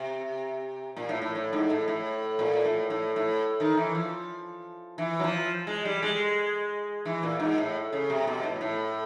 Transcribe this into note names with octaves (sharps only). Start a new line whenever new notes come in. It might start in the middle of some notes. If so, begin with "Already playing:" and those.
Already playing: C3
A#2
A2
A2
A2
G#2
A2
A2
A#2
A2
A2
A2
D#3
E3
F3
E3
F#3
F3
G#3
G3
G#3
E3
A#2
G#2
A2
C#3
C3
B2
A2
A2